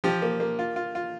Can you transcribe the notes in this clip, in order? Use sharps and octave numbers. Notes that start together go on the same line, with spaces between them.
F3 G4
A#3
A#3
F4
F4
F4